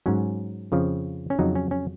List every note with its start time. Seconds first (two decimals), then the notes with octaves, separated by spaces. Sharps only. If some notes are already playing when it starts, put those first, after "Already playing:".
0.06 G#2 F#3 C#4
0.72 F2 C#3 F3
1.30 C#4
1.38 F2 C#3 F#3 D#4
1.55 C#4
1.71 C#4